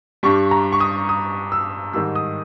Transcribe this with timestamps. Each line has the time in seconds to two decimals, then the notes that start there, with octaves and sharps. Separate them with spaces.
0.23 G2 G3 C#6
0.51 A#5
0.72 C#6
0.80 D#6
1.09 D#6
1.52 E6
1.93 G#2 D#3 G3 E6
2.15 D#6